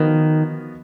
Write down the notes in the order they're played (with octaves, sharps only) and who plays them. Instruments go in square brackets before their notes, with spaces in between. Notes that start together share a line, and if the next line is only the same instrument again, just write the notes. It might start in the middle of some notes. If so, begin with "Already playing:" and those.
Already playing: [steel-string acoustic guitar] D#3 [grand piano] F3 B3 F#4